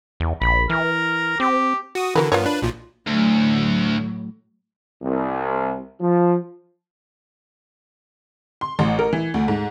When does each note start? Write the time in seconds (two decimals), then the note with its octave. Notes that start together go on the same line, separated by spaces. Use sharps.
0.20 E2
0.42 A#1 B5
0.70 E3 A#4
1.40 C4 G4
1.95 F#4 D#6
2.15 D3 E3 F#4 A#4 B4
2.32 G2 B3 F4 A#4 C#5
2.46 D4 B4
2.62 B1 A#2 F3
3.07 D2 A2 F#3
5.02 C2
6.01 F3
8.61 C6
8.79 A1
8.99 A#4
9.13 E3
9.34 D2
9.48 G#2